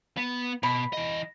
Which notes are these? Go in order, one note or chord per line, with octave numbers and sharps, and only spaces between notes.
B3
B2 B5
E3 D#5